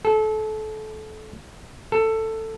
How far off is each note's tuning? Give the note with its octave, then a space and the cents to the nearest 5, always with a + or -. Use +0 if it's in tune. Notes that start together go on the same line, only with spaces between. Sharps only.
A4 -30
A4 +10